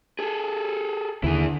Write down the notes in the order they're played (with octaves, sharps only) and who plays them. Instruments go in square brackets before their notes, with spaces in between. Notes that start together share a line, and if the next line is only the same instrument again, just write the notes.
[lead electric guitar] G#4 A4
[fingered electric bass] D#2 [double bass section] D3 [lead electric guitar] E4 G#4